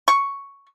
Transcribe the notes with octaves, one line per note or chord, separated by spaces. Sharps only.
C#6